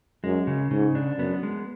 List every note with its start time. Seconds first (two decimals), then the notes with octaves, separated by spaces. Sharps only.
0.24 F#2 G#3
0.47 C#3
0.71 G#2 C#3
0.95 D4
1.19 F#2 B3
1.43 G#3